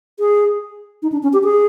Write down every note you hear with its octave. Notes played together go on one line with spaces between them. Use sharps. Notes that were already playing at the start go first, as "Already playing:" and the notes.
G#4
D#4
D4
C#4
G4
G#4